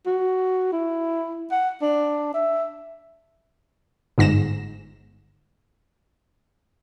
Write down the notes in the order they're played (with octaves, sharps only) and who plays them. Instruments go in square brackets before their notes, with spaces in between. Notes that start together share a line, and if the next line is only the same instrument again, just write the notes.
[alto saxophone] F#4
E4
F#5
D4
E5
[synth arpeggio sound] G1 G#2 A#6 E7